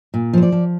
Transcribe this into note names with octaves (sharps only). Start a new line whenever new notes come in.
A#2
F3 C5
D5
F3